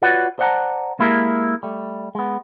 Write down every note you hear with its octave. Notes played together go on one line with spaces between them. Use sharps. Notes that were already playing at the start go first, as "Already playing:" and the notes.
F4 F#4 B4 C#5 D5 F#5
C5 D5 F#5 G5 A5 A#5
G#3 A#3 E4 G4 G#4 A#4
G3 A3
G#3 B3